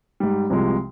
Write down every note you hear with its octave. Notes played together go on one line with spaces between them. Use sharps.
G#2 G3
C2 C3 F3 G#3